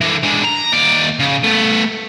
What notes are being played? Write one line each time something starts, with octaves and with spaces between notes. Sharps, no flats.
D3 E3
G#3 D4
A#5
D#2 D5
C#3
A3 B3